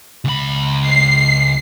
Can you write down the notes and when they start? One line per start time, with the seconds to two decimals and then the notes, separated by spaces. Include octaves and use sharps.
0.25 C#2 B5
0.88 C7